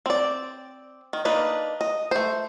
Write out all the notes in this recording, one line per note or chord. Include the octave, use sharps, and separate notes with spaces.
C4 D5
D#3
A#3 D4 D#4 B4
D#5
A3 C5